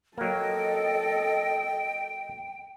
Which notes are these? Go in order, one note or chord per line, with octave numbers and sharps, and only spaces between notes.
F#3 A#3 A4 D#5 G5